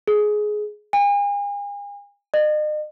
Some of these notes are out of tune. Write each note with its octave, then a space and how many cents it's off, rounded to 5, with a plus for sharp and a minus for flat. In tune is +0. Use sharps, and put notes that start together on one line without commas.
G#4 +15
G#5 -40
D#5 -40